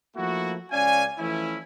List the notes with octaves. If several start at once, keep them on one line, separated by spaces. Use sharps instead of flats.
F3 A3 A#3 E4 F#4
C#2 C#4 D5 F5 G#5
E3 F3 A3 C#4 E4